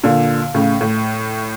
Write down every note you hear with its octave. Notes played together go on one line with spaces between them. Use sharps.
A#2 D3
A2 C#3
A2